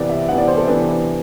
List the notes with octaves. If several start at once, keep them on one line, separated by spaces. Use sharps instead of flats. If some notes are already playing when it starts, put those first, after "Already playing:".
Already playing: C3 E3 B3 D5
E5
C3 E3 B3 F#5
D5
C5
A4
C3 E3 B3 D4